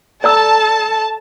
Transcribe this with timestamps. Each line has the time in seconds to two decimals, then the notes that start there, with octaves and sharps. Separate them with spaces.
0.24 A4 D5 A5 A#5 E6